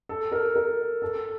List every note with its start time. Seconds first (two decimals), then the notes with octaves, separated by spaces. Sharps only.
0.09 A4
0.32 A#4
0.56 A#4
1.02 A4